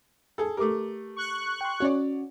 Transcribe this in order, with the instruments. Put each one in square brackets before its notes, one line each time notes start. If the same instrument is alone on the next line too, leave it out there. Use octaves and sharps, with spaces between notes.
[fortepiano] G#4 A4
[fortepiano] A3 A#4 [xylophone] G4 A4 D6
[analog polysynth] C#6 F#6
[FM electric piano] G5 C6
[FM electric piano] C#4 F#4 [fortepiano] C#5 D5